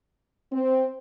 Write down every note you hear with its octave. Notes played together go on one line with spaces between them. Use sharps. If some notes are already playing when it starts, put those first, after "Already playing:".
C4